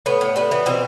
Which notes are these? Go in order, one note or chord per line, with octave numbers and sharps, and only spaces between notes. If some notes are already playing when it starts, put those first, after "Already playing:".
A2 B3
A2
G3 B3
E3
B2 C4